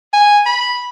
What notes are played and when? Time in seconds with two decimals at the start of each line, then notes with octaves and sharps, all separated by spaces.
0.13 G#5
0.46 B5